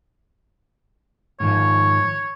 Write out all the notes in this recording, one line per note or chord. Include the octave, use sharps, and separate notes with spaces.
G#2 D#3 F3 C#5